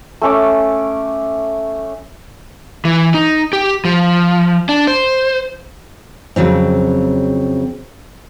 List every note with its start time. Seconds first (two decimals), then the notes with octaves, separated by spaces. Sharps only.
0.22 A3 C#4 D6
2.85 E3
3.14 D#4
3.53 G4
3.85 F3
4.69 D4
4.87 C5
6.36 F2 C#3 F#3 C4